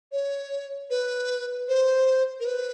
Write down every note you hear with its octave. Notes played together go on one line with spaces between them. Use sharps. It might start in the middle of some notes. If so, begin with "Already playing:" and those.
C#5
B4
C5
A#4
B4